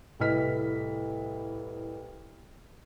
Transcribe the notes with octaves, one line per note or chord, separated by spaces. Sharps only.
C2 A2 B4 D#5 F6 B6